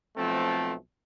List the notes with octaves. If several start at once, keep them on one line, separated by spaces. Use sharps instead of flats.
B1 F3 A3 C4 A4